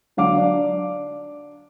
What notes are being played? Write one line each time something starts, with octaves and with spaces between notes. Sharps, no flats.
D3 F#3 F5 D6
D4